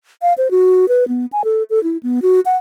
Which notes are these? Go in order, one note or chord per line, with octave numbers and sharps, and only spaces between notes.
F5
C5
F#4
B4
B3
G#5
A4
A4
E4
B3
F#4
F#5